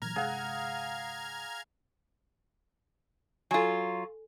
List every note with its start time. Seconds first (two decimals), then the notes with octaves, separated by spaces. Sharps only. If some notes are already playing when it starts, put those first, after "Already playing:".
0.02 A#2 E3 F#3 A#5 F6 G#6
0.16 G1 C3 G#3 G#4 F5 F#5
3.51 F#3 F4 A4 G#5